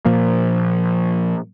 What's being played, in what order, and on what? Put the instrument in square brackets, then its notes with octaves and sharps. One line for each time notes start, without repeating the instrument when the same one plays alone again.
[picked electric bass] A#2 F3 A#3